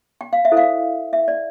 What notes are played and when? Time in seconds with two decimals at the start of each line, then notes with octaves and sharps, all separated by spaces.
0.21 G5
0.33 F5
0.45 E5
0.52 E4 A4 C5
0.57 F5
1.13 E5
1.28 D5